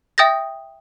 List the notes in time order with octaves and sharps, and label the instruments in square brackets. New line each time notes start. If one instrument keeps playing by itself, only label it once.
[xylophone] E5 G5 D#6 G6 A6 A#6